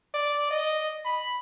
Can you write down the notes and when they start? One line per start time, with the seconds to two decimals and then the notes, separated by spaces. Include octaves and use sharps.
0.14 D5
0.51 D#5
1.05 B5